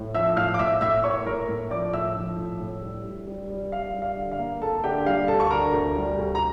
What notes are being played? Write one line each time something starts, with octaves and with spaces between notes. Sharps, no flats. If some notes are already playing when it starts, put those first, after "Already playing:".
Already playing: A2
F3 E5 E6
A2 F5 F6
D6
A2 E5 E6
A2 E5 E6
A#3 C#5 C#6
A2 A#4 A#5
A2
F3 D5 D6
A2 E5 E6
F3
A2
A2
G3
G3
G3
G3
G3 F5
G3
F5
D3
F5
A#3
A#3 A4 A5
D3 G4 G5
G3 F5
D2 A4 A5
C#6
D3 A#4 A#5
D2
G3
D2
A#5